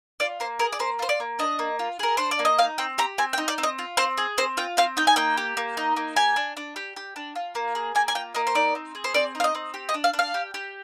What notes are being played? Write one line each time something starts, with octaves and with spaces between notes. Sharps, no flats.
F4 D5
A#3 C5
G#4 A#4
D5
A#3 C5
F4 C5
D5
A#3
D4 D#5
A#3
F4
G#4 A#4
D4 C5
D5
A#3
D#5
D#4 F5
C4 G5
G4 A#5
C4 G#5
G5
D#4
D5
C4
D#5
F4
C4 C5
G#4
C4 C5
F4 G5
C4 F5
D#4 G5
G#5
A#3 G5
G4
A#3
D#4
A#3
G4 G#5
D4
D4
G4
G4
D4
F4
A#3
G#4
A#3 G#5
G#5
F4 G5
A#3 D#5
C5
D#4 D5
C4
G#4
C5
C4 D5
D#4
F5
D#5
C4
G4
D#5
D4
F5
D4
F5
G4
G4